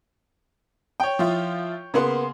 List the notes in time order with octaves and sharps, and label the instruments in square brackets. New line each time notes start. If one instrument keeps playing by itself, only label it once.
[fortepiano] C#5 G5
[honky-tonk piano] F3 E4 F4
[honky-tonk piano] C#3 C6 [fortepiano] A#3 B3 F#5